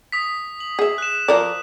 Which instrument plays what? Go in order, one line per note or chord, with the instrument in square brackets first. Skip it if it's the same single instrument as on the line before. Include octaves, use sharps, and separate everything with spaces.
[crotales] D#6 B6
F#7
[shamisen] G#4 E5
[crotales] F#6 E7
[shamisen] F3 A#4 D5